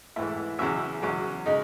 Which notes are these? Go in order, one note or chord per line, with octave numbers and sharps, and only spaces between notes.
G#2 E3 A3 E4
E2 C#3 F#3 C#4 E5
E2 C#3 F#3 C#4
C#3 G#3 D#4